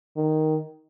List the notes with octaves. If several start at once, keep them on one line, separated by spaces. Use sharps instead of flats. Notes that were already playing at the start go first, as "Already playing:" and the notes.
D#3